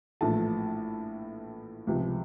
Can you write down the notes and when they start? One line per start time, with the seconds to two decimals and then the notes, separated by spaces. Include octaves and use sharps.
0.21 A#1 A2 E3 A3 A5
1.87 C#2 C3 F3